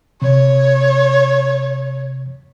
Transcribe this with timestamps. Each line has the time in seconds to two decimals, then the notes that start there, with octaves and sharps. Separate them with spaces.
0.22 C3 C#5